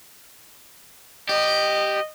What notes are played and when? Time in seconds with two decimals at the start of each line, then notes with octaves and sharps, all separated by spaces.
1.29 G4 D#5